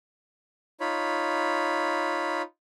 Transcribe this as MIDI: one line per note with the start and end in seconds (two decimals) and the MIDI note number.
0.80 2.42 63
0.80 2.42 65
0.80 2.42 73
0.80 2.42 83